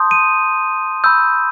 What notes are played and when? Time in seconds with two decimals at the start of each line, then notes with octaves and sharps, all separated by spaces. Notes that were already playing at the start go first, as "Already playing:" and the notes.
Already playing: A5 C6 D#6 G6
0.11 D#7
1.04 B5 E6 G6